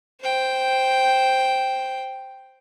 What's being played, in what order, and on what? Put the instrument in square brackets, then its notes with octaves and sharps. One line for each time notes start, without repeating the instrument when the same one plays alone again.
[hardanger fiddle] C5 G5